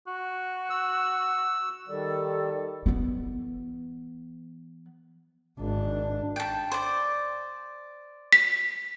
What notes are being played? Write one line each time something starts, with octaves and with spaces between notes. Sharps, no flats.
F#4
E6
D#3 G3 A4 D5
E3 B3
G#1 D4
G5 A5
C5 D5
B6